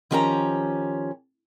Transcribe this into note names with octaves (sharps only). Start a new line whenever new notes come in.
D#3 F3 C#4 G4 F#5 A#5